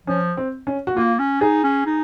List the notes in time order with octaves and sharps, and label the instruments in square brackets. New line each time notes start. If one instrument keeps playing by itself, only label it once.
[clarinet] F3 [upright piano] C#4
[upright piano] C4
C#4
F#4
[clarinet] A#3 [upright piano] F4
[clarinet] C#4
[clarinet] D#4 [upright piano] G#4
[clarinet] C#4
D#4